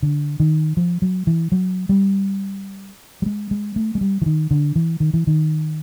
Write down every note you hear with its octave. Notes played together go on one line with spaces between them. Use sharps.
D3
D#3
F3
F#3
E3
F#3
G3
G3
G#3
G#3
A3
G#3
G3
E3
D#3
D3
E3
D#3
E3
D#3